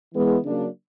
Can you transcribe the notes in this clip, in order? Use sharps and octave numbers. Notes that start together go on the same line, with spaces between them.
E3 G#3 B3
C#3 F#3 A#3 D4